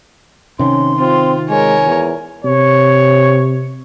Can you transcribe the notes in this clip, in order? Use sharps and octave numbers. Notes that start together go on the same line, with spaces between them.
C3 D#3 C#4 C6
C4 F4
G#3 A#4 C#5 G#5
E2
C3 C#5